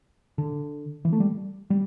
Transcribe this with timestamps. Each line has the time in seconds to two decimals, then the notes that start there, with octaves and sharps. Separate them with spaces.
0.38 D3
1.05 E3
1.13 A3
1.20 G3
1.70 G3